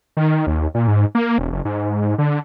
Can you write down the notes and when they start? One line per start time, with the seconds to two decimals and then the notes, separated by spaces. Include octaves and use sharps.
0.17 D#3
0.47 D#2
0.74 A#2
0.88 G#2
1.15 A#3
1.38 E1
1.52 F#1
1.65 G#2
2.18 D3